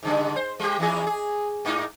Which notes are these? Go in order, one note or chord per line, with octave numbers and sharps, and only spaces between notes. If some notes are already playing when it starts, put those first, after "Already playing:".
G#2 C#3 G3
C5
G3 G4
E2 E3 G#4
G#4
G#2 A#3 D#4